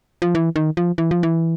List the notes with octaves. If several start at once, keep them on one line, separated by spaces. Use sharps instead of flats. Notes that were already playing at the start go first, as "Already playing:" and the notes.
F3
E3
D#3
F3
E3
F3
E3